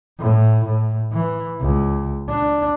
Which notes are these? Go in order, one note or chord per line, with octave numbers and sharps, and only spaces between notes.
A2
A2
E3
C#2
D4